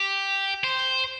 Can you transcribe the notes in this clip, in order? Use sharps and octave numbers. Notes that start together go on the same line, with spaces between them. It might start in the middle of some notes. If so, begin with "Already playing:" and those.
Already playing: G4
C5